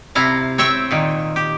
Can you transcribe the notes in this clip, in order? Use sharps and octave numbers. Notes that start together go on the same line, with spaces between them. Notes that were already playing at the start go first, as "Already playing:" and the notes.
C3 E4 F5 A#5
C4 C#5 E5 G5
A#2 D#3
G4